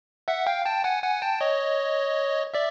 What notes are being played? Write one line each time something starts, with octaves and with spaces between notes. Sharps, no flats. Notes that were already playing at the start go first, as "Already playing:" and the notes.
E5 F#5
F5 G5
G5 A5
F#5 G#5
F#5 G#5
G5 A5
C#5 D#5
D5 E5